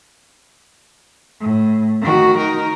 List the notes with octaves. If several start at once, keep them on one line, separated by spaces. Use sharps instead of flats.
A2
D#3 F#4
D#4 A#4